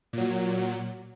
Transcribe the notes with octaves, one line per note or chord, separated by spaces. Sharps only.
A#2 F#3